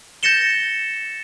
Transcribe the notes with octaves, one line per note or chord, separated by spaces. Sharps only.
G6 A6 A#6 C#7 E7 G7